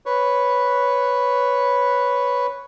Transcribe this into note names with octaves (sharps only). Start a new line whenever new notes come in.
B4 C#5